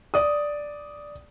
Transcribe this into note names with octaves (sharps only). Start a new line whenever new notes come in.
D5 D#6